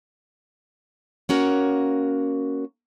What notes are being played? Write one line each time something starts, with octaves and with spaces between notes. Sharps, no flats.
A#3 C#4 F#4 A#4 C#5